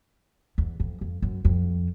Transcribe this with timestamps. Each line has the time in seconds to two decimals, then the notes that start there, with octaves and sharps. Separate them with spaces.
0.58 E2
0.80 F2
1.01 F2
1.22 F#2
1.45 F2